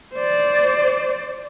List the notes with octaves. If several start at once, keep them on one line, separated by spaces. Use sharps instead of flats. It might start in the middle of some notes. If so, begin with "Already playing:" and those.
C5 D5